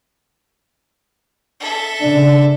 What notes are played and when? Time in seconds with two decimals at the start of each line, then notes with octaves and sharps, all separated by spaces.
1.60 A4 E5
2.01 C#3 D4